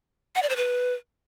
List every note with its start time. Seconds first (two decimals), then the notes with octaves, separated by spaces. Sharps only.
0.36 F#5
0.42 D5
0.49 C5
0.56 B4